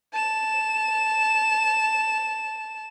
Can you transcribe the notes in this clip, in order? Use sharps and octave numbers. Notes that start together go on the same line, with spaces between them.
A5 E7